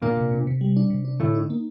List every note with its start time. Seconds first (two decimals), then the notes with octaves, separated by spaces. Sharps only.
0.02 A#2 A#3 D4
0.17 C3
0.31 C3
0.47 C3
0.61 G3
0.77 D4
0.90 C3
1.05 D4
1.20 A2 D3 A3
1.35 D#4
1.50 A#3